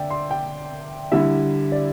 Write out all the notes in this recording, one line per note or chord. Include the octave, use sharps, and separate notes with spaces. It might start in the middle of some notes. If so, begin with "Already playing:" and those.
Already playing: D3 D5 E5 G5
C6
G5
D3 G3 E4 E5
D5